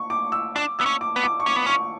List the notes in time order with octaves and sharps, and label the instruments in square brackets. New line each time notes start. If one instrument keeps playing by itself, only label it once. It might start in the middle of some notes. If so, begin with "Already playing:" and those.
Already playing: [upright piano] C#6
D6
E6
[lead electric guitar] D4 [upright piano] D6
[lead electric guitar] B3 [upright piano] E6
[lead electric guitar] C#4
[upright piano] D6
[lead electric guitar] B3
[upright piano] D6
C#6
[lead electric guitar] C#4 [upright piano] D6
[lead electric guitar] B3
[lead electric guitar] C#4 [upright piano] C#6